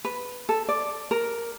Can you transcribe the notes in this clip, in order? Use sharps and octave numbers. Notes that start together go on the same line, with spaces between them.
B4
A4
D5
A#4